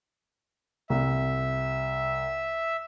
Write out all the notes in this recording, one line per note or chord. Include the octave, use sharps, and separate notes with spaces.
C2 E5